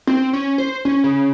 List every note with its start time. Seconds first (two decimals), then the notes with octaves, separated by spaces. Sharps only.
0.07 C4
0.33 C#4
0.58 C5
0.85 C#4
1.04 C#3